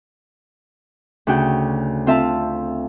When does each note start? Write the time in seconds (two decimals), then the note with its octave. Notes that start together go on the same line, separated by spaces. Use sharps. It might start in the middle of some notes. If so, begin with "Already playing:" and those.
1.27 D2 C#3 F#4 G5
2.07 C4 F4 A4 E5 F5 A5